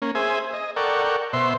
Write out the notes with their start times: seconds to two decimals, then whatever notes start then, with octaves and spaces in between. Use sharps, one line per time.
0.02 A#3 C#4
0.15 G#4 C5 E5 G#5
0.53 D#5
0.77 A4 A#4 D5 F#5 G5 C#6
1.33 B2 C5 E5 C6